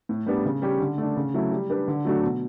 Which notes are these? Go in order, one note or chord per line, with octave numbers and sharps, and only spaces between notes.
A2
G3 B3 D4
C#3
G3 C#4 G4
D3
A3 D4
C#3
F#3 A3 E4
G3
D4 G4 B4
D3
F#3 A3 D4 F#4
B2